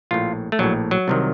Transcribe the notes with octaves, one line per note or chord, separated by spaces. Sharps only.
A#1 A2 F4
A3
A#1 A2 F#3
F#3
C2 C3 D#3